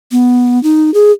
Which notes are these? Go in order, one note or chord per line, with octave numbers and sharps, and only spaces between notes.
B3
D#4
G#4